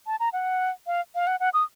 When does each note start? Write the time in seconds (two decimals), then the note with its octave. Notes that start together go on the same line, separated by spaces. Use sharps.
0.07 A5
0.20 A#5
0.33 F#5
0.87 F5
1.15 F5
1.27 F#5
1.40 F#5
1.54 D#6